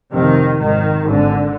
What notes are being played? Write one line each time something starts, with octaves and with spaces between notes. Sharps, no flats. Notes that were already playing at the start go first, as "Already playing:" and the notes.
F1 F2 C3 D#3
G#1 G#2 D#3
G#1 G#2 D3